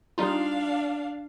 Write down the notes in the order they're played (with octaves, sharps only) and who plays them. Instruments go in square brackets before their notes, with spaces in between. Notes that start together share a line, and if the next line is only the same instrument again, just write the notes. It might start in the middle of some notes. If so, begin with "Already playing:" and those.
[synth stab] G3 D#4 F4 [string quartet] D4 F5